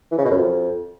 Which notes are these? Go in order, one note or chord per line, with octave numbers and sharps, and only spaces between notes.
E3
C#3
B2
F#2
F2